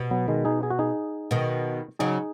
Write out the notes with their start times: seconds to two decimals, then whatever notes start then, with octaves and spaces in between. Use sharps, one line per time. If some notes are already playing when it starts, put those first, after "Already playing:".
Already playing: B2
0.11 F#3 B3
0.28 D#3 G#3
0.45 D#4 G#4
0.63 G#4
0.71 F#4
0.79 D#4 G#4
1.31 B2 D#3
1.99 C#3 F#3 D#4 G#4